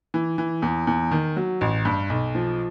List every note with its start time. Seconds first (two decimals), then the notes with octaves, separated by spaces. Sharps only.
0.14 E3
0.38 E3
0.62 E2
0.87 E2
1.11 D#3
1.37 F#3
1.61 A1
1.85 G2
2.10 B1
2.35 F3